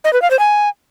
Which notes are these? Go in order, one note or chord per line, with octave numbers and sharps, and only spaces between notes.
D#5
B4
F5
C5
G#5